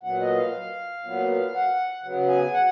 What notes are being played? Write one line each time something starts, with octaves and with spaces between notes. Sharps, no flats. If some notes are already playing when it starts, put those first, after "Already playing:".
A#2 F#3 B3 F#5
D#5
F5
A#2 F#3 B3
F#5
C#3 F#3 B3
G#5
F#5